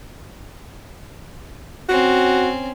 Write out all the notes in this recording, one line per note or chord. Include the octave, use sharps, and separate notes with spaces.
C4 C#4 F#4